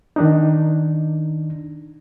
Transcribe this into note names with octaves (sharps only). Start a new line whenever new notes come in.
D#3 D4 D#4